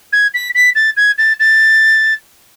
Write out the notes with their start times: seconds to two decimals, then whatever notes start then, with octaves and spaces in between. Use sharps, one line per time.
0.13 G#6
0.34 B6
0.55 B6
0.75 A6
0.97 G#6
1.18 A6
1.40 A6